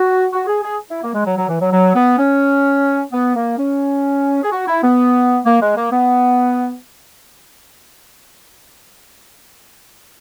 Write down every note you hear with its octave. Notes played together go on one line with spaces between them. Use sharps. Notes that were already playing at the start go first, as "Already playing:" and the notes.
Already playing: F#4
F#4
G#4
G#4
E4
A#3
G#3
F#3
F#3
E3
F#3
F#3
B3
C#4
B3
A#3
C#4
G#4
F#4
E4
B3
A#3
G#3
A#3
B3